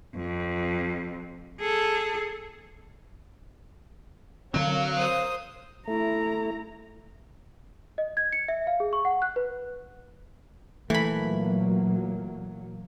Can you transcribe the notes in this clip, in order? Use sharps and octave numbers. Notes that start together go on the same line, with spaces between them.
F2
G#4 A4
D3 F#3 C4 A#4 C#5 F5
C5 D#6
A3 E4 A#5
D#5
G#6
C#7
E5
F5
G#4
C#6
F#5
F#6
B4
A#2 E3 F#3 A3 A#3 B5